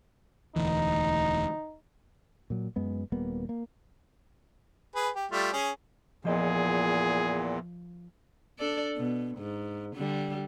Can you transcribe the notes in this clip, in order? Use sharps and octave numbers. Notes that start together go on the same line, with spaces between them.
E1 D2 E3 D#4
A#2 F#3
F#2 G#3 B3
D#1 G3 A#3 B3
A#3
G#4 B4
G4
G3 A3 F4
C#4 G#4
E2 A#2 F3 G#4 D#5
D4 A4 D5
B2
G#2
D3 G3